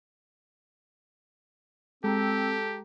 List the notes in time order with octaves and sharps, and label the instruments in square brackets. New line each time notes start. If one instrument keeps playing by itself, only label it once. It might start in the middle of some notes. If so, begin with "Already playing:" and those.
[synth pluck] G#3 A#5 [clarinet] C4 [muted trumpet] G4 [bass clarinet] A4